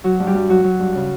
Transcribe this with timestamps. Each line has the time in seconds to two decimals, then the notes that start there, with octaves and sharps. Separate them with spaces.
0.04 F#3 F#4
0.20 G2
0.26 G3 G4
0.35 G2
0.49 F#3 F#4
0.64 F#3
0.79 G2
0.95 C#3